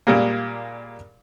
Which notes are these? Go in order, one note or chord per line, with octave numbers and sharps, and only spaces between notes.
A#2 G3 G#3 A#3